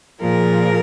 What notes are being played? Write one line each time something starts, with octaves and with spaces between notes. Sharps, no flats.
A#2 F3 G#4 A#4